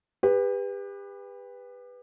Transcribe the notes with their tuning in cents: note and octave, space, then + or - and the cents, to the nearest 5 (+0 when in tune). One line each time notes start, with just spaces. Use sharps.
G4 +35 B4 +0